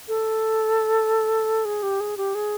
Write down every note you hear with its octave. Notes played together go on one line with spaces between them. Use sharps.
A4
G#4
G4
G#4
G4
G#4